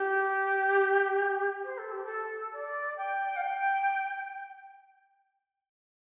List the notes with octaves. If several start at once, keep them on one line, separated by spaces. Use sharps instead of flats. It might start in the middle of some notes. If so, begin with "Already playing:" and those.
Already playing: G4
C5
A4
G4
A4
D5
G5
F5
G5